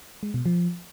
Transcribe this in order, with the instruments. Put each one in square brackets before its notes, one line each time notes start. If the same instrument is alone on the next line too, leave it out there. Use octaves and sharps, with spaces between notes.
[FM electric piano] G#3
B2
F3